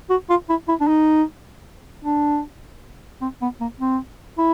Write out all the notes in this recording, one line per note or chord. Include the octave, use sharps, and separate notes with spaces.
F#4
F4
E4
E4
D4
D#4
D4
C4
B3
A#3
C4
E4